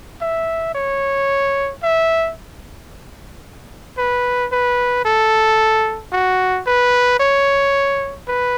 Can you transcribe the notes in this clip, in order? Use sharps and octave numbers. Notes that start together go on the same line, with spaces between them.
E5
C#5
E5
B4
B4
A4
F#4
B4
C#5
B4